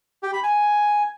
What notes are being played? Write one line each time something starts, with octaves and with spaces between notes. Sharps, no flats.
G4
B5
G#5